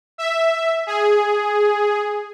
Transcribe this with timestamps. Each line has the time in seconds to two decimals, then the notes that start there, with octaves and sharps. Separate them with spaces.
0.18 E5
0.87 G#4